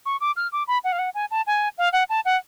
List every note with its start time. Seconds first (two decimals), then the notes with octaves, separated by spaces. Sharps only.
0.06 C#6
0.20 D6
0.36 F6
0.52 D6
0.67 B5
0.84 F#5
0.92 F5
0.99 F#5
1.15 G#5
1.31 A5
1.47 G#5
1.78 F5
1.93 F#5
2.09 A5
2.25 F#5